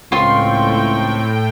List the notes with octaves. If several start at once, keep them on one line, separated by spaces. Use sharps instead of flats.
C#2 A2 C4 F4 G5 C6 C#6